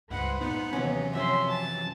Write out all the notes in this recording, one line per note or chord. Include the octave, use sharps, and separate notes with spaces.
C#2 G2 G#3 B4 C5 F#5
A#2 B3 D#4 F#5
D#2 C3 E3 F#3 B3 C#4
F#2 F3 C#4 E5 C6
A5